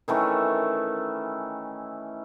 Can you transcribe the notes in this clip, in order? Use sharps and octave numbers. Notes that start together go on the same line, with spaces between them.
D#3 E3 A3 C#4